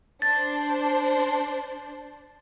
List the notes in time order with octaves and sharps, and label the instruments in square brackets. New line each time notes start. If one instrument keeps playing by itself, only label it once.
[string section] D4 C5 [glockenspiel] A6